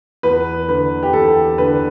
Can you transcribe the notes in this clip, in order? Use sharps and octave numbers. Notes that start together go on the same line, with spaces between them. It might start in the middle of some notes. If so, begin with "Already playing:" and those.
E2 B4
D3 B4
G4
E2 A4
D3 B4